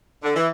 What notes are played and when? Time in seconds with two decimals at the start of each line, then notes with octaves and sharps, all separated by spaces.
0.24 D3
0.36 E3